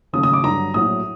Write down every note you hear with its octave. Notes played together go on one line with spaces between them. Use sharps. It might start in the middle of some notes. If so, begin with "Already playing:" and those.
D#2 C#3 F#3 A3 D#6
D#6
D6
G2 D3 F#3 A#5
A#1 A2 F#3 D#6